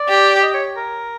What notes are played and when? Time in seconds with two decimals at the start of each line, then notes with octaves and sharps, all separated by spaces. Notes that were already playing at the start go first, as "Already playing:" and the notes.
Already playing: D5
0.09 G4
0.43 D#5
0.54 C#5
0.76 A#4